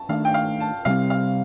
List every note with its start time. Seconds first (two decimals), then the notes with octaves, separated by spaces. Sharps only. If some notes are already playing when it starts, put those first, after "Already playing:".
Already playing: A5
0.09 D#3 A3 D4 F5
0.25 G5
0.34 F5
0.60 A5
0.85 C3 G3 C4 F5
1.10 F5